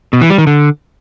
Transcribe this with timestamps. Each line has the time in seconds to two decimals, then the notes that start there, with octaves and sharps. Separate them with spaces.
0.13 B2
0.21 E3
0.30 G3
0.38 D#3
0.47 D3